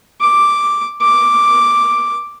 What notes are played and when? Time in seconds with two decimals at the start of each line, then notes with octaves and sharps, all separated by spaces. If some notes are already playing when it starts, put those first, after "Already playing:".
0.21 D6
1.02 D6